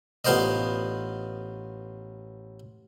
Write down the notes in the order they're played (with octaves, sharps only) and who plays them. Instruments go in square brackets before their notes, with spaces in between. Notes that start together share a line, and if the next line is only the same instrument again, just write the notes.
[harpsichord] A1 B3 F4 C5 D5 D#5